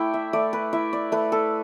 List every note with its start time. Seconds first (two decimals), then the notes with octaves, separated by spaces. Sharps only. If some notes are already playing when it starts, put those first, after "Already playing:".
Already playing: A3 E4 D5 G5
0.14 E5
0.33 A3 D5
0.53 B4
0.73 E4 E5
0.93 D5
1.12 A3 B4
1.32 A4